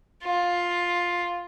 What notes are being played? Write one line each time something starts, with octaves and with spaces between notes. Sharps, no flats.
F4